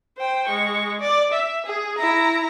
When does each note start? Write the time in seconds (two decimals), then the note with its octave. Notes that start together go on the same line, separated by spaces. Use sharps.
0.18 C5 G5
0.47 G#3 C#6
1.00 D5
1.32 E5
1.66 G#4
1.98 E4 A#5